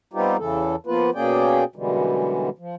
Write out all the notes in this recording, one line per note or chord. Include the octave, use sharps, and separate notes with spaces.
G3 B3 C4 D#4 F4 G4
E2 C#3 E3 A4
F3 A#3 B3 F4 B4
B2 A#3 C#4 G#4 D5 G5
F#2 B2 D3 E3 G3 G#3
F3